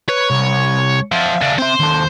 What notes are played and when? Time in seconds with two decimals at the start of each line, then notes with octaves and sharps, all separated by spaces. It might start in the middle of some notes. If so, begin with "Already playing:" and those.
0.09 B4 C#5
0.30 C2
1.12 F3 C4 E5 F5
1.42 C#3 D4
1.58 C4 C5 E5
1.80 D#2 A4